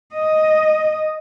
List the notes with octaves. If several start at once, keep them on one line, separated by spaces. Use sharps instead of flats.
D#5